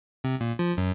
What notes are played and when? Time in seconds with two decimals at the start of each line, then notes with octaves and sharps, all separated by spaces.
0.24 C3
0.40 A#2
0.59 F3
0.77 F#2